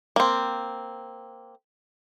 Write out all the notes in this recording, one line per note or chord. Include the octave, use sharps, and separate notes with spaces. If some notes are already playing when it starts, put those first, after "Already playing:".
A#3 C4